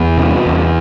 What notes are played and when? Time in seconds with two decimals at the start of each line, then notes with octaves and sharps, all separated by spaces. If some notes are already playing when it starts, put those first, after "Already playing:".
Already playing: E2 B3
0.17 C3
0.46 E2